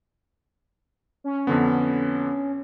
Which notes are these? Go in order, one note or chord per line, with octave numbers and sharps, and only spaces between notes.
C#4
F2 D3 B3